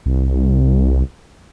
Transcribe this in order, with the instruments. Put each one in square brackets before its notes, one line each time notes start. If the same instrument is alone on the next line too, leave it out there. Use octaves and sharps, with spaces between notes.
[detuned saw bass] C2